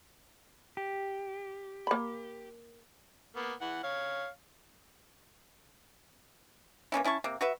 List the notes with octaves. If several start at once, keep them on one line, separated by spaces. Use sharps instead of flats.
G4
A#3 B5
A#3 B3
E3 F#5
C#5 F5
E3 A#3 C#4 E4
C#4 E4 A5 C#6
C3 A#3
F#4 B4 E5